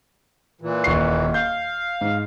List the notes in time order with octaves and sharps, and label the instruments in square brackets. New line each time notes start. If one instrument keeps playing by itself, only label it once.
[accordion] A#2 E3
[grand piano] D#1 C#6 C7
[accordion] F5 [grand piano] G6
[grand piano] G#2